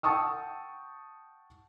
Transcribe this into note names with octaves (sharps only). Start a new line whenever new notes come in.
F#5 G5 A5 C#6 D#6 E6